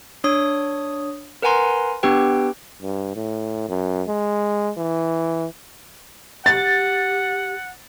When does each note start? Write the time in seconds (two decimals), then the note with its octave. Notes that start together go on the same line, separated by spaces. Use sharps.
0.24 D4 C#5 D#6
1.42 A#4 B4 F#5 G#5 A#5 C6
2.03 B3 D4 G4 B4 G5
2.83 G2
3.16 A2
3.69 F#2
4.08 G#3
4.77 E3
6.46 G4 F#5 A6